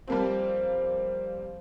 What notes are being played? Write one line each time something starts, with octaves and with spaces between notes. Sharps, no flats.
F3 G3 A#3 C4